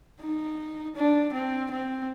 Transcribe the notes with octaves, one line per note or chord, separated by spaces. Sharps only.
D#4
D4
C4
C4